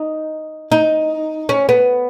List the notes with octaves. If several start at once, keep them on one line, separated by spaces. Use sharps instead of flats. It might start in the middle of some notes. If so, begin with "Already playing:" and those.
Already playing: D#4
D#4
C#4
B3